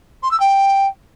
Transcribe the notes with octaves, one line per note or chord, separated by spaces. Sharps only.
C6
E6
G5